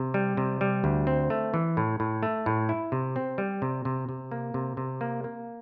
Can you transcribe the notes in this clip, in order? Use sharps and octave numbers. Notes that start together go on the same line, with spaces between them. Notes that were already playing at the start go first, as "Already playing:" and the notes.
Already playing: C3
G3
C3
G3
D2
C4
A3
E3
A2
A2
A3
A2
E4
C3
C4
G3
C3
C3
C3
A#3
C3
C3
A#3
A#3